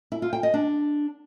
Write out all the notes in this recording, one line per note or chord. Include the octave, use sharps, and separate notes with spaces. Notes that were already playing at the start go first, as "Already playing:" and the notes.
E4
F4
G5
D#5
D4